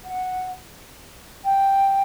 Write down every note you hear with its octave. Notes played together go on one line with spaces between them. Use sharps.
F#5
G5